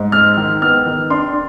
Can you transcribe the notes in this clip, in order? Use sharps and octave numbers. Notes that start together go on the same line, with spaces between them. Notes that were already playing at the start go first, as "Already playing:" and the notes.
Already playing: G#2
G#3 F6
D#3
B3 F6
D#3
D4 C6